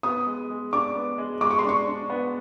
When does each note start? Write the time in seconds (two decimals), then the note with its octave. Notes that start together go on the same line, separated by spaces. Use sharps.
0.03 B3 D#6
0.27 G#3
0.50 G#3
0.73 D4 D6
0.95 B3
1.18 G#3
1.41 G#3 D6
1.51 C#6
1.59 C6
1.65 D4 C#6
1.87 D4
2.10 B3